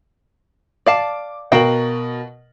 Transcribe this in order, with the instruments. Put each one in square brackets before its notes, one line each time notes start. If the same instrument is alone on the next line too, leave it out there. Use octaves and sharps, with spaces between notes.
[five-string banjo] D5 F5 A5 [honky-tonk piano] D6
[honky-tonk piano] B2 A#4 F#7 [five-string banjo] F#4 F5 G5